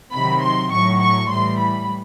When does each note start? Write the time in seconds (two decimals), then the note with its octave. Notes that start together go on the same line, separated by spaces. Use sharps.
0.12 C3 D#3 F#3 B5
0.42 C6
0.72 A2 F#3 C#6
1.01 C#6
1.30 A2 E3 G3 C6
1.59 B5